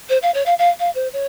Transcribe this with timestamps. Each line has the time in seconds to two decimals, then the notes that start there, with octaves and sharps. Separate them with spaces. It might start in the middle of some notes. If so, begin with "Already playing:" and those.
0.09 C5
0.22 F5
0.34 C#5
0.46 F5
0.58 F5
0.79 F5
0.95 C5
1.13 C#5